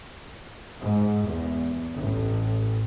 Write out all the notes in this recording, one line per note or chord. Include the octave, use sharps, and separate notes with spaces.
G#2
E2
A1